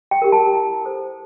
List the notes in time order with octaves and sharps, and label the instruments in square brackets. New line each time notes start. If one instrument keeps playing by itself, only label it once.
[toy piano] G5
G4 A#4
A5
E4
A4 C5